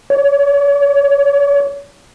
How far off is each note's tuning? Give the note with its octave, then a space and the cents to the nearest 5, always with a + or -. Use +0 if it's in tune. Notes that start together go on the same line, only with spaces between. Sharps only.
C#5 +40